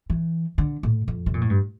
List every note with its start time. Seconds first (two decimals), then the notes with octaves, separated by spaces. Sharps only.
0.10 E3
0.58 D3
0.83 A2
1.08 F2
1.26 C3
1.34 A#2
1.41 A2
1.50 G2